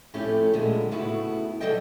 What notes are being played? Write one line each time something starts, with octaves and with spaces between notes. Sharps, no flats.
F2 A2 A3 C4 C#4 G4
A#2 D3 F#3 G#3 B3
A2 C#3 B3 E4 F#4
C#3 F#3 D4 A4 D#5 G5